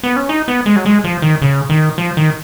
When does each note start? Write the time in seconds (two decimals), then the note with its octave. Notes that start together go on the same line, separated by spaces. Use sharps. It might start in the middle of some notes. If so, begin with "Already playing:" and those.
0.03 B3
0.16 C#4
0.29 D#4
0.48 B3
0.66 G#3
0.76 F#3
0.86 G#3
1.04 F3
1.22 D#3
1.42 C#3
1.70 D#3
1.98 F3
2.17 D#3